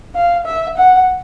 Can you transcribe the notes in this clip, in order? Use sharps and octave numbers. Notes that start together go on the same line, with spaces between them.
F5
E5
F#5